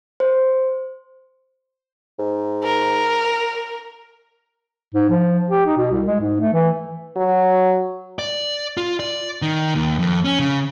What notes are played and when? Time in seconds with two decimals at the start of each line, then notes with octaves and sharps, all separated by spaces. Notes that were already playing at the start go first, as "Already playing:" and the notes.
0.20 C5
2.19 G#2
2.64 A#4
4.95 G#2
5.10 F3
5.50 G4
5.66 D#4
5.77 B2
5.92 C2
6.07 G#3
6.21 G#2
6.40 A3
6.53 E3
7.17 F#3
8.19 D5
8.77 F4
9.00 D5
9.42 D#3
9.75 D#2
9.99 F2
10.25 C#4
10.39 C#3